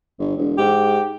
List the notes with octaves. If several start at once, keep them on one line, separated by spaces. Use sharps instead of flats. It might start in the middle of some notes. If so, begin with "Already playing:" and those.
G1
E1
G#2 G4